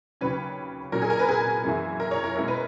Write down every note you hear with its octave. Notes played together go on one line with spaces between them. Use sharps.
D#2 C#3 F#3 C#4 B4
A#2 F#3 C#4 A#4
G#4
A#4
B4
G#4
F#2 E3 A#3 E4
A#4
C#5
A#4
B2 G#3 C#4 E4 A#4
B4